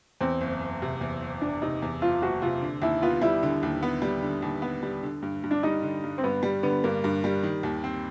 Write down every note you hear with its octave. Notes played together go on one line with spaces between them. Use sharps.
E2 C4
F#1
F#1
C3
E2
F#1
F#1 D4
C3 D#4
E2
F#1 F4
F#1 F#4
C3 F4
D3
D#2 E4
B3 F4
G3 E4
D3
D#2
B3
G3
D3
D#2
B3
G3
D3
G2
G2
D4
G3 D#4
D3
G2
C4
G2 B3
G3
D3 B3
G2 A#3
G2
G3
D#3
D#2
C4